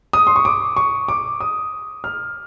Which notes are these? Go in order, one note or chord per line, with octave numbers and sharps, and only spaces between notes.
D#6
C6
C#6
D6
C#6
D6
D#6
F6